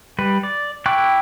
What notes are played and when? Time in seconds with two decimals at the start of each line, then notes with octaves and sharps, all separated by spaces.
0.18 G3 B4
0.43 D5
0.86 E4 G5 C#6 D6 F#6